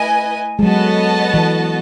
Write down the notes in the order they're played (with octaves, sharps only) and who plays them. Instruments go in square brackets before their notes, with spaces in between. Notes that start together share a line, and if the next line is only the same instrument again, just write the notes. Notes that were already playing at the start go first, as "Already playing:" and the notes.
Already playing: [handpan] A3 [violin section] E4 B4 D#5 G#5
[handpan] G#3
[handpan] F#3 [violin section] B3 F#4 A4 D#5 A5
[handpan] E3